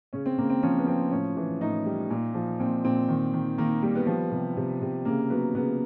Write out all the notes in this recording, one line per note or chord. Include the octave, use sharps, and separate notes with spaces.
C#3 C#4
C4
C#3 A#3
C4
F3 C#4
B3
F3 C4
A2 C#4
E3
A2 D#4
G3
A#2
F3
A#2 C4
A#2 C4
D#3
D#3
D#3 A#3
G3 A#3
B3
F3
C3
C3
C3
C#3 A#3
F#3 B3
C#3 B3